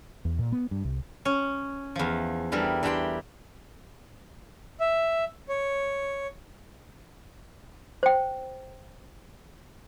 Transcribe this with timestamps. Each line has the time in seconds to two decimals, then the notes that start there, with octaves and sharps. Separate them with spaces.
0.25 E2
0.39 A#2
0.52 B3
0.71 G2
0.85 C2
1.25 C#4 C#5
1.96 E2 F3
2.52 E3 G3 D4 A4 A#4
2.83 E3 D4 G4 G5 C6
4.80 E5
5.49 C#5
8.03 C5 G5